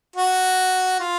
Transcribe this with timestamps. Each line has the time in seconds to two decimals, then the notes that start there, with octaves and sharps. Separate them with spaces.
0.16 F#4
1.00 F4